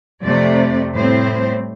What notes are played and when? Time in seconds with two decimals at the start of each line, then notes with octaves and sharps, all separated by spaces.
0.22 F2 C3 A3 D5
0.93 A2 G3 C4 C5